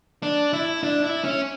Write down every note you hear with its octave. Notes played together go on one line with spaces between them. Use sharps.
D4
E4
D4
E4
C#4